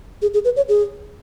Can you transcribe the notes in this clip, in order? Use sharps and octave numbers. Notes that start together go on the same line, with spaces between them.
G#4
G#4
B4
C#5
G#4